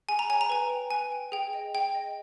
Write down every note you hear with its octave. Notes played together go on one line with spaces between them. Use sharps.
G#4 G#5
A#5
C#5 G5 G#5
A#5
B4 G#5
G5
B4 G#5
G5
G#4 G5
D#5 G5
G#4 G5
D#5 G5